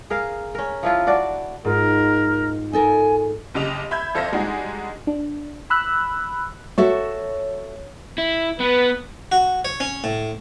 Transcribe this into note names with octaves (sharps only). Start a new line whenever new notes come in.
G#4 A#4 F5
C#4 A#4
F3 E4 F4
D4 F#4 D5
G#2 G#3 F4 A#4
D#4 A4 A#4 G#5
F#1 C#3 G4 D#5 F7
E5 B5 G6 G#6
F2 A4 C5 E5 F5 A#6
G3 G#3 D4 D#4 F#4 G#4
D4
B5 E6 F#6
F#4 A4 C#5 E5
E4
B3 B4
F#4
C#5
C#4
A2